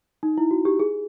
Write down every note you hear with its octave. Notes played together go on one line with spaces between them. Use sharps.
D#4
E4
F#4
G4
G#4